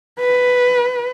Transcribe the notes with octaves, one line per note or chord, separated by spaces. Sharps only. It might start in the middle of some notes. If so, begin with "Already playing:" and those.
B4